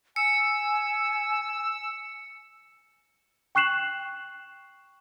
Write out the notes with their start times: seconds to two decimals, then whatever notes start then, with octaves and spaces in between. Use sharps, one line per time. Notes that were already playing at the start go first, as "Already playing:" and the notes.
0.16 G#5 E6 C#7
3.55 G5 C#6 F#6 C7 E7 F#7